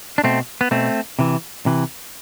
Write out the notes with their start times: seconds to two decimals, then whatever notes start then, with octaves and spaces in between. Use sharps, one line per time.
0.18 D4
0.24 B2 A3 C4
0.61 B3
0.71 B2 A3 C4
1.19 C3 E3
1.66 C3 E3